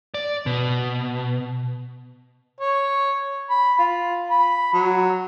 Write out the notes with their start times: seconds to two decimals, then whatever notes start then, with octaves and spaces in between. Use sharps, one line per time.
0.14 D5
0.46 B2
2.61 C#5
3.50 B5
3.78 F4
4.30 B5
4.74 F#3